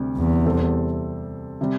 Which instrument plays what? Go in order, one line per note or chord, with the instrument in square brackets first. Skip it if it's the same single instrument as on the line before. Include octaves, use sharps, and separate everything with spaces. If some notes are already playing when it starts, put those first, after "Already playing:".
Already playing: [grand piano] D2 C3 G3 C4 G4
[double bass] E2
[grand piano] C3 G3 C4 A4
C3 G3